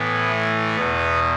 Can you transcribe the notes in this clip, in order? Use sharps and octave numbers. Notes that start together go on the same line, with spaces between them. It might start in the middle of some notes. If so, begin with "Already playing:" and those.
Already playing: A2 E3 B3
A3
E2 B2 B3